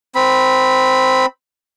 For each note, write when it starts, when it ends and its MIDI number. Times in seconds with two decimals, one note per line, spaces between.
0.15 1.26 60
0.15 1.26 83